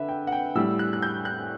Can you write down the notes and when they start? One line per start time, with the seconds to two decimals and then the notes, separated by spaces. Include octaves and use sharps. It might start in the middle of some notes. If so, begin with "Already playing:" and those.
Already playing: D3 B4 E5
0.09 G5
0.27 F#5
0.32 G5
0.55 A2 G3 E6
0.79 F#6
0.93 F#6
1.02 G6
1.25 F#6